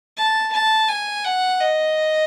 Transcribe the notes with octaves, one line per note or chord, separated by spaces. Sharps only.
A5
A5
G#5
F#5
D#5